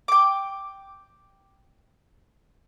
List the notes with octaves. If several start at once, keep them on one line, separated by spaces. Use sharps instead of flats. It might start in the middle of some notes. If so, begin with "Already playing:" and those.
G5 D6